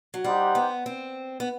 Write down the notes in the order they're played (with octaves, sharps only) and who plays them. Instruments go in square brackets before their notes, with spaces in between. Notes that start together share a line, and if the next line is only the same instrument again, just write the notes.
[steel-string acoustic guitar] F#3
[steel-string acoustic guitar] G3 [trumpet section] D#4 G4 C5 F#5
[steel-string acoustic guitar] B3
C4
B3